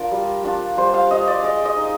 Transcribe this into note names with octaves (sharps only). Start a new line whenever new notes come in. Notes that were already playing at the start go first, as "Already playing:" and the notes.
Already playing: D4 F4 A#4
G3
D4 F4
G3 C5
F5
D4 F4 D#5
D5
G#3 D#5
D#5
D#4